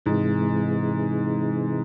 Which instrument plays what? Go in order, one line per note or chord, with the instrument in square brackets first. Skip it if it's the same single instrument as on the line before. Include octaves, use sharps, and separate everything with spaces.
[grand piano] G#2 [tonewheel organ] C3 E3 G#3